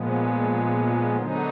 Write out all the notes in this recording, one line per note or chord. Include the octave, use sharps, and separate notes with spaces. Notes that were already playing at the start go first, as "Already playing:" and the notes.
Already playing: A#2 F3 G#3 B3
D3 F#3 B3 D#4